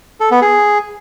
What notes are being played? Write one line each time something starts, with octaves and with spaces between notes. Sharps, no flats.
A4
B3
G#4